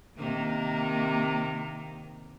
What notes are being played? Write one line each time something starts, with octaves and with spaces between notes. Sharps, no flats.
C3 D#3 A#3